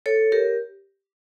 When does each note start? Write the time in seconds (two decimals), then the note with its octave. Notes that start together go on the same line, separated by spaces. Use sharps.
0.06 A4 C#5
0.32 G4 A#4